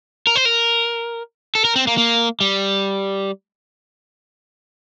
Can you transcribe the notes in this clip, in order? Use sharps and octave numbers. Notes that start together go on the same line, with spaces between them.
A#4
C5
A#4
A4
A#4
C4
A#3
A#3
G3